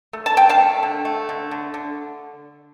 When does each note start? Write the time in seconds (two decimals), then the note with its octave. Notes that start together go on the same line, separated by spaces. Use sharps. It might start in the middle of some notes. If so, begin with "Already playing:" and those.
0.13 A3
0.26 A5
0.37 A3 G5
0.49 F5 A5
0.60 A3
0.83 D3
1.05 A3
1.29 D3
1.51 D3
1.74 D3